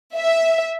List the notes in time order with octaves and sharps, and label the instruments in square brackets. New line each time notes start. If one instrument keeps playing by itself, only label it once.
[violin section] E5